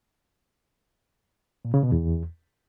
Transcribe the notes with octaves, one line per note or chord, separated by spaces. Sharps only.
A#2
C#3
B2
E2